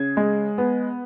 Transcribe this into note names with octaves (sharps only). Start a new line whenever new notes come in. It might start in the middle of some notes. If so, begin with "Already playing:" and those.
Already playing: C#3 G#6
G#3
B3